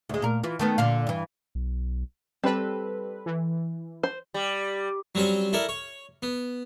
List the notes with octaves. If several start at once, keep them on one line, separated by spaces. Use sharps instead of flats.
D2 G#3
A#2 A#4
E3 F4
D#3 A3 B3
A#2 D3 F5
G2 E3
B1
G3 C4 A4 B4
E3
C5
G3
F#3 G3 C4 C#4 C5
E4 A4 A#4 D5
C#5
B3